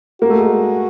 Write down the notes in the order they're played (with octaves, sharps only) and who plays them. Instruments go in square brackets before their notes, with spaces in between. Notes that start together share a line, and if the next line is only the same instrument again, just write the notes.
[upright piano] A#3 [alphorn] F#4
[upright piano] A3
G#3